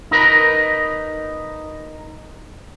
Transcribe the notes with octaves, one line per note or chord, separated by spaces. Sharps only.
D#4 A#4 B4